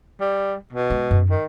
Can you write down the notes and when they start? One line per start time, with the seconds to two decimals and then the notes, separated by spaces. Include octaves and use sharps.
0.20 G3
0.73 B2
0.90 G#3
1.11 F#2
1.30 D#3